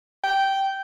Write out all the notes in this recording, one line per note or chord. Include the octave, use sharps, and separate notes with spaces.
G5